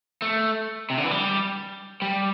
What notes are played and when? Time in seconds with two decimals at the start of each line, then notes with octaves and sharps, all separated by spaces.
0.22 A3
0.90 C3
0.97 D3
1.04 E3
1.11 G3
2.02 G3